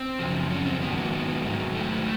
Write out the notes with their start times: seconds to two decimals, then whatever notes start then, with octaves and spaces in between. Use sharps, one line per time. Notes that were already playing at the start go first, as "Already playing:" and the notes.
Already playing: C4
0.19 F#2 C#3 F3
0.51 C#4
0.66 C4
0.82 G#2 D#3 F#3 B3
0.97 A#3
1.13 B3
1.44 G#2 D#3 F#3
1.75 A3